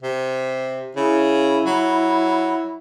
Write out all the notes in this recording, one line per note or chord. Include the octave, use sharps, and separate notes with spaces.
C3
C#3 E4
F#3